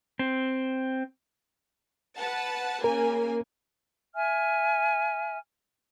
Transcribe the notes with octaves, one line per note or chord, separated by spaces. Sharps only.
C4
B4 F#5 A5
C#3 A#3 A#4 G#5
E5 G#5 F6